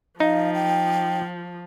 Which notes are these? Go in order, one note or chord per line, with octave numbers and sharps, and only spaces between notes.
F3 D#4 F5
G5